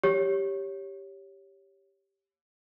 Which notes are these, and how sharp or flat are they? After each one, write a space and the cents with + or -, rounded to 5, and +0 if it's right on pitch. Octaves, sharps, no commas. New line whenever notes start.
G4 +0 C#5 +0